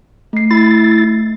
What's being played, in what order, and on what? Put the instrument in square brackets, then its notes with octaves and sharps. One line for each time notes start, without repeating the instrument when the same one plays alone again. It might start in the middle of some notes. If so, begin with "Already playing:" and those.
[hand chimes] A3 C7
[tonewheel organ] E4 A6